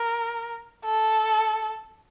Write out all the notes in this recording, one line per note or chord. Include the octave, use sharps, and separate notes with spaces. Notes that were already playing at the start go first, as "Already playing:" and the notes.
Already playing: A#4
A4